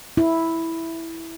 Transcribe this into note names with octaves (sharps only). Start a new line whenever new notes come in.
E4